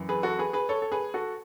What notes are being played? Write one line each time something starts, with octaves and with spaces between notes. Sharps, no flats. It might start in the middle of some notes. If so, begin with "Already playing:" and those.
Already playing: F#2 E3
G#4 B4
F#4 A4
G#4 B4
G#4 B4
A4 C#5
A4
G#4 B4
F#4 A4